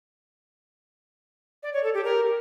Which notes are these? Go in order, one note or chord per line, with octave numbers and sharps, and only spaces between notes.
D5
C#5
A4
G4
A#4